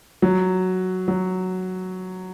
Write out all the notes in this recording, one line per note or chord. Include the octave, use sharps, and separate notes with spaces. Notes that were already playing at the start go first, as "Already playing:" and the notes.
F#3
F#3